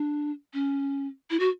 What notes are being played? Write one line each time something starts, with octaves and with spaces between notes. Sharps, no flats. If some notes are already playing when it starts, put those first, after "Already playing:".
Already playing: D4
C#4
E4
F#4